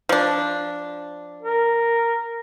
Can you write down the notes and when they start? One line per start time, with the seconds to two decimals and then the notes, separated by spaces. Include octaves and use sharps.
0.09 F3 D4
1.42 A#4